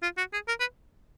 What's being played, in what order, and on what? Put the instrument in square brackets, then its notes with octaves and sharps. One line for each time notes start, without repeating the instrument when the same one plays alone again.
[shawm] F4
F#4
G#4
A#4
B4